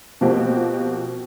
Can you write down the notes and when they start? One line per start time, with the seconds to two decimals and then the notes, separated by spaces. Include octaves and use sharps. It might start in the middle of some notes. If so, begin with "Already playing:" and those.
0.21 B2 F3 A#3 C4 F#4 G4